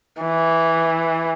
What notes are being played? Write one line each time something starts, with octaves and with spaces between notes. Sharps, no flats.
E3